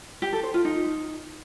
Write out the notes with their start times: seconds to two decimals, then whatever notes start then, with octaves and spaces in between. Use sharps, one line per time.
0.22 G4
0.33 A4
0.43 C5
0.54 F4
0.65 D#4